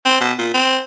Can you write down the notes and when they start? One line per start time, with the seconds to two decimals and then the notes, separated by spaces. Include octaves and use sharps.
0.05 C4
0.21 B2
0.39 A#2
0.54 C4